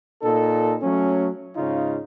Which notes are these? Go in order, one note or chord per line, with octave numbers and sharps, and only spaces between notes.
A#2 D#4 A4
F#3 A3 C#4
G#2 C#3 D#4 F4